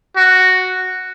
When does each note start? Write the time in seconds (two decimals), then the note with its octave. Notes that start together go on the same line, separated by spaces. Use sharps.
0.17 F#4